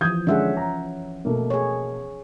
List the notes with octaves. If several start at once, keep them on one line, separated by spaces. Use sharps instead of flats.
E3 F3 D#6 G6 G#6
D3 G#3 C#4 E5 F#5
A#5
B2 A3 A#3
G#4 C#5